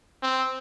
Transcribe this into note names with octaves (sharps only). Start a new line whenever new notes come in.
C4